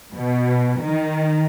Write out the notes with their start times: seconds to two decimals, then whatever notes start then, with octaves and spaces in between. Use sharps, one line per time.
0.14 B2
0.80 D#3